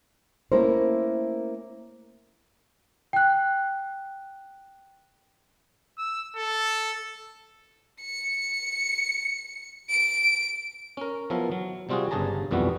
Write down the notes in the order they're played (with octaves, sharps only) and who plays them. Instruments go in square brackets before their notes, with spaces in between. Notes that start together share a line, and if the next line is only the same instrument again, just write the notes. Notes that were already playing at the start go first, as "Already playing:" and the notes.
[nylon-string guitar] A3 A#3 C#4 E4 A#4 C5
[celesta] G5 F#6
[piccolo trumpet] E6
A4
[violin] C#7
D7
[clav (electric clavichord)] C#4 A#4
F3 F#3 B3 E4 A#4
F#3
C3 G3 C4 F4 F#4 G#4
G1 G2 C#3 G#4 A5 A#5
B1 F2 E3 G3 B3 F#4